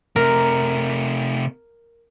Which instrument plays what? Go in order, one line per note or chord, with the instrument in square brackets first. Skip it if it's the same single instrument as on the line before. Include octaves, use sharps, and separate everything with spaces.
[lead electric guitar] C3 A3 [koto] A#4